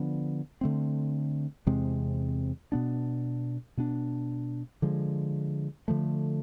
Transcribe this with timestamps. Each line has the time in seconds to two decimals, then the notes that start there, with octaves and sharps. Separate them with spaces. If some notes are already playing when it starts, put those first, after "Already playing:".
Already playing: D3 F3 B3 D4
0.61 D3 A3 C4
1.66 E2 C3 G#3 C4
2.72 B2 B3 D4
3.77 B2 B3 D4
4.82 D3 F3 G#3
5.88 D3 F3 A3